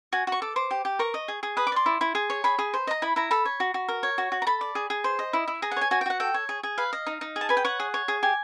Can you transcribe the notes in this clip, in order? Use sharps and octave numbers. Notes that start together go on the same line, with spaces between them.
F#4 G#5
F#4 C#6
A4 D6
C5 D6
G4
G4
A#4 C#6
D#5
G#4
G#4
B4 D#6
D6
D5 C6
E4
E4
G#4
C#5
G#4 B5
G#4
C5
D#5 A#5
E4 B5
E4 A#5
A4 B5
C#5
F#4
F#4
A#4
C#5
F#4
F#4
A#5
A4 B5
D5
G#4
G#4
C5
D#5
E4
E4
G#4 A#5
F#5
C#5 G#5
F#4 G#5
G5
F#4 F#5
A4 G5
C#5
G#4
G#4
B4 F5
D#5
D#4
D#4
G#4
A5
B4 G#5
G5
C#5 F#5
G#4
C#5
G#4
G4 G#5